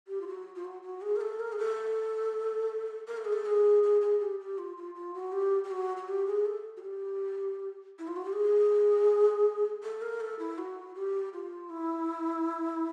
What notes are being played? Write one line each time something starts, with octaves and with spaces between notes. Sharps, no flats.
G4
F4
F#4
F4
F#4
F#4
G#4
A#4
A4
A#4
G#4
A4
A#4
A4
G#4
A4
G#4
G#4
G#4
G4
G4
F4
F4
F4
F#4
G4
G4
F#4
F#4
G4
G#4
A4
F#4
G4
E4
F4
F#4
G4
G#4
A4
A#4
A4
E4
F#4
G4
F4
E4